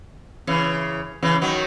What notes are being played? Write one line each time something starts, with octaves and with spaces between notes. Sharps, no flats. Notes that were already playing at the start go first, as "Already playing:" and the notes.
C#3 E3
C#3 E3
D#3 F#3